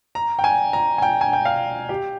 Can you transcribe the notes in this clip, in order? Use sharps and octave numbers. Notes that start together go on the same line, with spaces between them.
A#5
G5
G#5
A#5
G#5
G5
G#5
G5
F5
G4